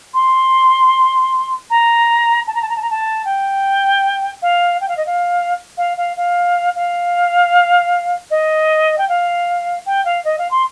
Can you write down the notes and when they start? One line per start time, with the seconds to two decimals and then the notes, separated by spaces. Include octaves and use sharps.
0.14 C6
1.70 A#5
2.47 A5
2.54 A#5
2.62 A5
2.69 A#5
2.76 A5
2.82 A#5
2.90 A5
3.25 G5
4.42 F5
4.81 G5
4.88 F5
4.97 D#5
5.06 F5
5.77 F5
5.97 F5
6.17 F5
6.75 F5
8.30 D#5
8.98 G5
9.08 F5
9.86 G5
10.05 F5
10.24 D#5
10.38 F5
10.51 C6